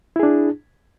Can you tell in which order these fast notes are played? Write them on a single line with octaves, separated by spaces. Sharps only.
E4 G#4 D4